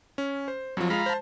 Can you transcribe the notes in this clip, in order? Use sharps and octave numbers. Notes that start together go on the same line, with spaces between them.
C#4
C5
F2 F3 F#3
G#3 F4 F5 A#5 B5
C5 A5